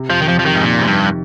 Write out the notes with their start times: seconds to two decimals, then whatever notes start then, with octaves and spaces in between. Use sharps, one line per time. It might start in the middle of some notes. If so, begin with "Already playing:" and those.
Already playing: C3
0.10 F2 F3
0.22 D#3
0.28 F2 F3
0.39 F3
0.45 C3 D#3
0.55 G#2
0.64 A#2 D#3
0.79 G#2
0.82 C3
0.87 G2